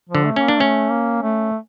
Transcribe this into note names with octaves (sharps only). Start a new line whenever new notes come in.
F3
D3
A3
C#4
A#3
D4
A3 C#4
A#3
A3